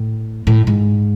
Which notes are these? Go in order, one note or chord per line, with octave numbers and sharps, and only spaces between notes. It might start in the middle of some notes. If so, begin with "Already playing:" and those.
Already playing: A2
A2
G#2